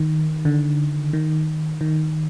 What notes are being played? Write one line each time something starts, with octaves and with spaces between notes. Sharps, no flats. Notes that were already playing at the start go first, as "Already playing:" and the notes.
Already playing: D#3
D3
D#3
D#3